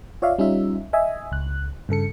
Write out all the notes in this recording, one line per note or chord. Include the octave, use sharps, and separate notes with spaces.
F4 C#5 D5 E5 F5
G3 C#4 D#4 F4 E5
D#5 E5 G#5
C#2 F#6
G2 C#3 A4 C#7